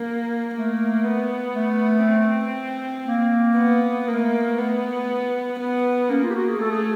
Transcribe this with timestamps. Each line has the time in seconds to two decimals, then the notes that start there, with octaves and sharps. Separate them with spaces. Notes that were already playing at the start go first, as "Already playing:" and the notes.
Already playing: A#3
0.54 A3 A#3
1.05 B3
1.55 A3
2.06 C4
3.07 A#3
3.57 B3
4.08 A3 A#3
4.58 A3 B3
5.60 B3
6.09 A#3 C#4
6.23 F4
6.30 G4
6.35 F#4
6.47 G#4
6.61 A3 A4
6.71 G#4